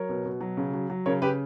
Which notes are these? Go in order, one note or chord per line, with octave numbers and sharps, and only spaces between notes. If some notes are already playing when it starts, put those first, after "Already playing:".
Already playing: F#3 A#4 C#5
B2
B2
F#3
C#3
F#3
F#3
C#3 A#4 C#5
C#3 G4 B4